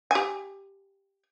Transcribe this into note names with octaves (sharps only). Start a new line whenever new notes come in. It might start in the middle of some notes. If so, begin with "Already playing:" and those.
G4 G#5